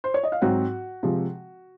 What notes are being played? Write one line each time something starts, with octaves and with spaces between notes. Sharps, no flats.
C5
C#5
D#5
F5
G#2 F#3 C4 F#4 F#5
C3 F3 G#3